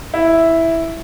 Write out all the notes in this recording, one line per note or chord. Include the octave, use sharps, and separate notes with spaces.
E4